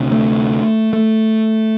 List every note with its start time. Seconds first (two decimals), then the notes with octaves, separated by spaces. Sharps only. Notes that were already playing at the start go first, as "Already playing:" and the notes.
Already playing: D2 C3
0.12 A3
0.93 A3